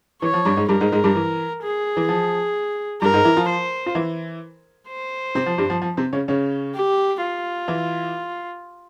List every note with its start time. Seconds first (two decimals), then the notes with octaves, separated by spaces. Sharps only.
0.22 E3 C#5
0.34 F3
0.45 G2 G3
0.57 G#2 G#3
0.69 G2 G3 A#4
0.81 G#2 G#3
0.92 G#2 G#3
1.04 G2 G3
1.16 E3
1.63 G#4
1.97 E3
2.09 F3
3.01 G2 G3 A#4
3.13 G#2 G#3
3.25 E3 E4
3.37 F3 F4
3.49 C5
3.86 F4
3.95 E3 E4
4.88 C5
5.35 C3 C4
5.46 F3
5.58 G2 G3
5.70 F3
5.82 F3
5.97 C3 C4
6.13 C#3 C#4
6.28 C#3 C#4
6.74 G4
7.21 F4
7.68 E3 E4